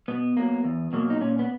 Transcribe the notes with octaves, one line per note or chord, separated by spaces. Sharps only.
B2 B3
F#3 A#3
E2
B2 F#3 A#3
D#4
A#2 C#4
B3